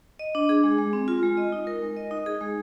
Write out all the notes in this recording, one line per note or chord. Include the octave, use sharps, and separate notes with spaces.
D#5
D4
G#4
G#3
G#3
C4
F4
G#3
D#5
D#4
A#4
G#3
D#5
D#4
G#4
G#3